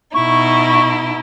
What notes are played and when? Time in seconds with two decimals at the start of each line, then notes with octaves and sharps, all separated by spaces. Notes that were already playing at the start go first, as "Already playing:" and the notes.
0.14 B2 D#4 E4 C#6